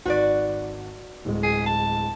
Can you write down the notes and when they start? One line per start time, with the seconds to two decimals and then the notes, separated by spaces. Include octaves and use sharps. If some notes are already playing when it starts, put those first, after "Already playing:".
0.05 G#1 F#4 B4 D5
1.25 D1 G#3
1.43 G#4
1.66 A5